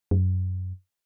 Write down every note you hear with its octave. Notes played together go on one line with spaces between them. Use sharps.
F#2